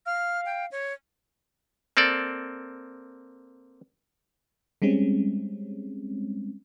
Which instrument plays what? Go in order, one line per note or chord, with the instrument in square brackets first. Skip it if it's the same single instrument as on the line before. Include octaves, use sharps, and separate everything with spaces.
[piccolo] F5 [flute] F6
[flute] G5
C#5
[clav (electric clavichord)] A#3 C4 A4 D5
[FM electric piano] G3 G#3 C4 C#4